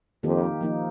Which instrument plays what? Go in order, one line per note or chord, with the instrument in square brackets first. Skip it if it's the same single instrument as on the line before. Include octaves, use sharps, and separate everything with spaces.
[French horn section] F2 [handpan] D#3 A#3 D#4 G4
[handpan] F3 A#3 D#4